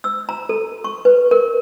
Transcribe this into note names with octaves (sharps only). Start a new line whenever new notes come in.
E6
A#5
A4
C#6
B4
A#4